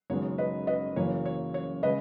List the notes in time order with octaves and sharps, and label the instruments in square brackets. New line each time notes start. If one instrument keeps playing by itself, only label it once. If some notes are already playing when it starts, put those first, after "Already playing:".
[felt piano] F#1 F#2 D#3 G#3 B3 C#5
B4 D#5
B4 D#5
F#1 F#2 E3 A#3 C#5
C#5
C#5
C#3 G#3 C#4 B4 D#5